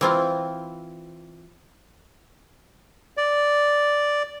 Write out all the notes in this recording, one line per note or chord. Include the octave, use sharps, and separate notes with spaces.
E3 C4 F4
D5